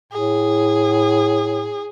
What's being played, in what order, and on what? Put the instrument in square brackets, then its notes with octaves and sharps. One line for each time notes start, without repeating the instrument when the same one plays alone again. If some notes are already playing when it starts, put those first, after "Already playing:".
[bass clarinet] A2 [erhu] G#4